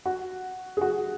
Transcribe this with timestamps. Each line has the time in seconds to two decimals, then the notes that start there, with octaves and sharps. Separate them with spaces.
0.06 F#4
0.77 G#4
0.81 F#4